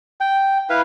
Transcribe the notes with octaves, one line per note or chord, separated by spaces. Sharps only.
G5
E4 B4 F5